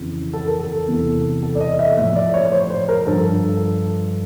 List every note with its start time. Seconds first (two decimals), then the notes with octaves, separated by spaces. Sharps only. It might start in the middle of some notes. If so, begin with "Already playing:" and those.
Already playing: F2 C#3 E3
0.33 A4
0.47 A#4
0.60 A4
0.87 E2 C3 E3
1.43 A4
1.55 D5
1.60 D#5
1.79 E5
1.97 A2 F3 E5
2.15 D5
2.34 C#5
2.45 C#5
2.52 C5
2.70 C5
2.89 A#4
3.06 G2 D3 F3 A4